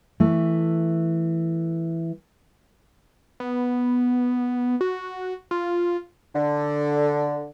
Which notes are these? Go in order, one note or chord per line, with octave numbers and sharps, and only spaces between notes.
E3 A3
B3
F#4
F4
D3